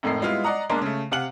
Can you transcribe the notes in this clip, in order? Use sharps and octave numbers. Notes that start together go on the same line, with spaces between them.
G#1 F2 A2 D#4 A#4 C7
G3 G#3 B3 E4 F4
D5 D#5 F#5 A#5 D#6
B1 G#3 A#3 D4 A#5 C6
C#3 A3
C3 F5 F#5 F#7